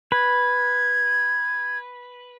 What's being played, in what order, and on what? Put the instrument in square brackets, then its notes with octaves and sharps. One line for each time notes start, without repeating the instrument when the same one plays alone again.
[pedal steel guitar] B4 [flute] G#6